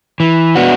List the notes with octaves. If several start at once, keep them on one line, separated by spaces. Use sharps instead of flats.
E3
B3 D4 F#4